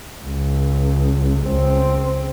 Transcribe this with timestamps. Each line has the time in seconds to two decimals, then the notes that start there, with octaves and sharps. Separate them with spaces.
0.23 C#2
1.44 C#2 C4